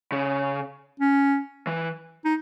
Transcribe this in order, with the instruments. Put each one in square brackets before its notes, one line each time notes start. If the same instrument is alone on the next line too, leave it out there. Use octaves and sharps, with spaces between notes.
[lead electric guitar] C#3
[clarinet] C#4
[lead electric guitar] E3
[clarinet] D#4